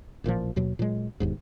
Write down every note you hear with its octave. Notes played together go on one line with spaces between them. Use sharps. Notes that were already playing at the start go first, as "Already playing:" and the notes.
A1 A#2 D3 F3
D#2 B2 F#3
A#2 F#3 G#3
E1 D#2 G#2